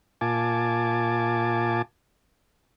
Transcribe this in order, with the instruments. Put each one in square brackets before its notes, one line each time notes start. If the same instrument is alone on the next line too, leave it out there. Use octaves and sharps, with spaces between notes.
[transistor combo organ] A#2 F4 G#5 A5 D6